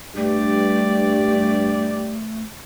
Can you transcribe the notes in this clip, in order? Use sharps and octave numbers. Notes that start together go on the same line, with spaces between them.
G2 A3 G4 D5